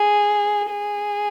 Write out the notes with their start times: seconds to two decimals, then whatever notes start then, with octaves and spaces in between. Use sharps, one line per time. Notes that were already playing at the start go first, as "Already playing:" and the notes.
Already playing: G#4
0.70 G#4